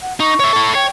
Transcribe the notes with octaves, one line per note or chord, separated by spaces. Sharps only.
F#5
D#4 C#6
C#5 E5
E4 A4
C#5 G5